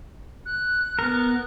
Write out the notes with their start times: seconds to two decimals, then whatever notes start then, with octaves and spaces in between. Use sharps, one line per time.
0.46 F#6
0.99 B3 A#4